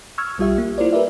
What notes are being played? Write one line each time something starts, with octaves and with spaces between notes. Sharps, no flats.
C#6 E6 F6 G#6
B1 G3 F4 G4 E5
A#3
E4 F4 A#4 C5 D5
G4 A#4 B4 D5 E5